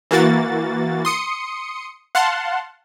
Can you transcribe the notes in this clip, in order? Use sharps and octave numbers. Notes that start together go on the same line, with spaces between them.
E3 A#3 F#4 A6
C6 D#6 C#7
F5 F#5 A5 C6